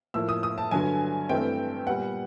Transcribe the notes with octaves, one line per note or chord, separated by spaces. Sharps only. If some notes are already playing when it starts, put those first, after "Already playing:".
A2 F3 A#3 E6
D#6
D#6
A5
G2 D3 F#3 G#5
G2 E3 A3 C4 G5
A#2 G3 B3 F#5